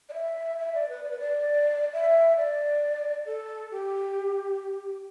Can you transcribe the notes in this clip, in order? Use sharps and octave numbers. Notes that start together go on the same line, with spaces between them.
D5
E5
E5
D5
B4
D5
B4
D5
E5
D5
A4
G4